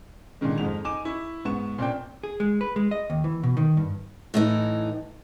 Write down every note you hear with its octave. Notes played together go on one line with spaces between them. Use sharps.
A#2 D3 D#3 G#3
F2 G#2 F7
D#4 G#5 D6 E7
E4 C#6
G#2 B3 C#6 E7
A#2 C4 D4 G5
G#4
G#3
B4
G#3
D#5
D#2
E3
B2
D#3
G2
A2 E3 D#4